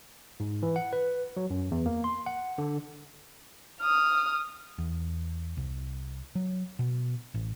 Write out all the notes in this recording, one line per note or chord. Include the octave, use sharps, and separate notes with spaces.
G#2
E3
F#5
B4
F#3
F#2
E2
A#3
C6
F#5
D3
D#6 F6
E2
C2
F#3
B2
A1